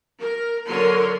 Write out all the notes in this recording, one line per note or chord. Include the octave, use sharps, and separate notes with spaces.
A#4
D3 F#3 A#4 C#5 C6